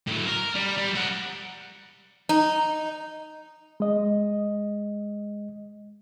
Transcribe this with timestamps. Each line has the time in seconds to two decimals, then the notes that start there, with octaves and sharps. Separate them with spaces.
0.07 A2 F#3
0.26 A#4
0.55 G3
0.78 G3
0.96 A#4 F#5
2.29 D#4
3.80 G#3 D#5